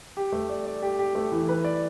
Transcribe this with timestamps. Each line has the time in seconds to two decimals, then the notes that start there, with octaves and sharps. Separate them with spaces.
0.17 G4
0.32 A3
0.49 D5
0.66 D5
0.83 G4
0.99 G4
1.15 A3
1.32 E3
1.49 B4
1.64 D5